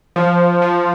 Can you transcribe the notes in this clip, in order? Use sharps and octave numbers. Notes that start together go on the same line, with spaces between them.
F3
F3